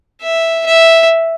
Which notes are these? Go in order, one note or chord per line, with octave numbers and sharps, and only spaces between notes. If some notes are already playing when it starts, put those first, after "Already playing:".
E5
E5